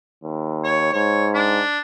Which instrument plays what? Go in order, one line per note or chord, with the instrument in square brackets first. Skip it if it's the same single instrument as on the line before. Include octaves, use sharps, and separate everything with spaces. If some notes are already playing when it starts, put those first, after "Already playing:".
[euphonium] D#2
[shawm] C#5
[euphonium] G#2 [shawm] C#5
[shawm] D4